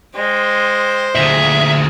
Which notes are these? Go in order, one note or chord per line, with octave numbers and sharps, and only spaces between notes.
G#3 C5 G5
D2 A#2 G#4 E5